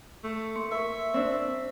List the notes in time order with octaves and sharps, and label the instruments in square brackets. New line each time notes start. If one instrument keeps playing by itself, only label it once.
[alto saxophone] A3
[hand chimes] A#3 C6 C#7
[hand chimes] A#4 C#6 [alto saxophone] E5
[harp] C4 D4